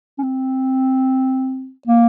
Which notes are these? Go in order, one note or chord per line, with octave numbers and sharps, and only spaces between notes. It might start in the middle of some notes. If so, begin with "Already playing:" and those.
C#4
C4
A#3